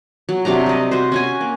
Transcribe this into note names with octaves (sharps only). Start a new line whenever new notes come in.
F#3
C3 F#3 D4 A#5
G3 D#5
F#4 C5
C#4 F#4 G#5
A#3